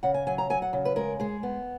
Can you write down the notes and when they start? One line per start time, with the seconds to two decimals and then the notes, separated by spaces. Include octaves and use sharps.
0.03 C#3 F#5
0.14 G#5
0.27 F#3 G#5
0.38 A#5
0.50 F#3 G#5
0.62 F#5
0.73 C#3
0.85 B4
0.96 G#3 A#4
1.20 G#3 G#4
1.43 B3